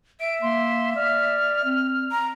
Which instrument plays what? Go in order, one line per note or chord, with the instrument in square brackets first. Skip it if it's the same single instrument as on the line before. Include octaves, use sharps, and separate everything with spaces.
[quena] E5 [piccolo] D7
[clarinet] A#3 [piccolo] C6
[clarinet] D5 [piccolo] F6
[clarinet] C4
[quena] A#5